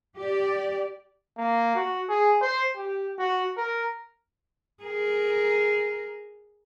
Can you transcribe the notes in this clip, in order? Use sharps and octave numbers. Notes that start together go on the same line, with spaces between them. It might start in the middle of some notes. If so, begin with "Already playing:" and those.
G4 D5
A#3
F#4
G#4
C5
G4
F#4
A#4
G#4 A#4